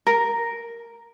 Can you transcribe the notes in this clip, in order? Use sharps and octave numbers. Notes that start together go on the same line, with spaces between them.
A#4